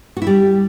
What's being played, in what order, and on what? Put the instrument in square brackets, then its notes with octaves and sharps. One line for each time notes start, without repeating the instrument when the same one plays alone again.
[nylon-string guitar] F#4
E4
G3